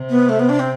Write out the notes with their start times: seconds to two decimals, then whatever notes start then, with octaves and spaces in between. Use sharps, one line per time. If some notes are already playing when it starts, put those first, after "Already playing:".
Already playing: C3
0.10 B3
0.29 A3
0.39 B3
0.49 D4
0.59 C4